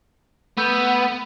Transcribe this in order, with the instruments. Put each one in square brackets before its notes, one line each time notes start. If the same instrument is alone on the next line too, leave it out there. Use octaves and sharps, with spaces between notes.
[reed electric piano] A3 E6 G6 [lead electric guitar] B3